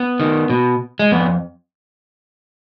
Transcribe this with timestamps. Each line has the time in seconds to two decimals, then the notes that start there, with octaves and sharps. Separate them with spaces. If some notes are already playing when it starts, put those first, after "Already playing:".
Already playing: B3
0.20 D#3
0.50 B2
0.99 G#3
1.12 F2 B3